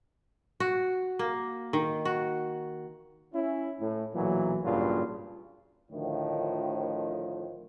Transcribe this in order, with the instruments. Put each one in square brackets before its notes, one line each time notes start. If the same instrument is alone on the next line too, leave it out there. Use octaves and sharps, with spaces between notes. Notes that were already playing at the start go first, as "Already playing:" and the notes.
[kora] F#4
A#3
D#3
F#4
[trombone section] C#4 E4
A2
B1 A#2 E3 F#3
A1 G2 A#2 C#3 F#3 F4
[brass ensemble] D2 A2 D#3 F3